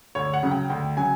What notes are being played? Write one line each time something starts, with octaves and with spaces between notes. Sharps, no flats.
D2 C#5
F#5
C#3 F#3
G5
D2 G5
C#3 F#3 G#5